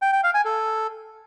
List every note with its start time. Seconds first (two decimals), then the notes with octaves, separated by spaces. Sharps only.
0.02 G5
0.13 G5
0.23 F5
0.34 G#5
0.45 A4